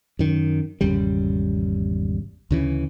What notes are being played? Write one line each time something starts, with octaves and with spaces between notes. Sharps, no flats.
F#2 D#3
G#1 E2 C#3 G3
D2 C#3 E3